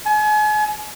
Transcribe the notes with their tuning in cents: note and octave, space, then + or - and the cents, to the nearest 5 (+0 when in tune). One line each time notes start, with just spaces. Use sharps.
G#5 +40